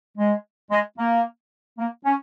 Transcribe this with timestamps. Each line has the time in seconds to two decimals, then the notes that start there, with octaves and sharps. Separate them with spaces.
0.16 G#3
0.71 G#3
0.97 A#3
1.78 A#3
2.05 C#4